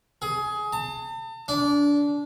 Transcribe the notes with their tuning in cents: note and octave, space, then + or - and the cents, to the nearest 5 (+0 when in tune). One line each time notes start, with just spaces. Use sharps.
G#4 +20
A5 +40
D4 -20